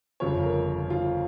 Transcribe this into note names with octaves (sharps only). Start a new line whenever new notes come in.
G1 F2 C#3 C#5
A#4
F4